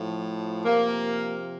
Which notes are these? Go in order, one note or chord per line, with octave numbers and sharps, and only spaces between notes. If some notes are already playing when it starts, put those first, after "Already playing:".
Already playing: A2 F3
C3 F3 A#3